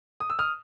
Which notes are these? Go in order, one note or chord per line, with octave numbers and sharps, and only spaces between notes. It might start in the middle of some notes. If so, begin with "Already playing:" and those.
D#6
E6
D#6 F6